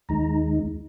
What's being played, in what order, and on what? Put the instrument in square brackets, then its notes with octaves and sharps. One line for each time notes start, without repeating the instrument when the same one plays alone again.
[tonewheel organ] D#2 D#3 G#3 D#4 A#5